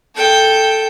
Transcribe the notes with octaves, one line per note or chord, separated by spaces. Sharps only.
A4 G5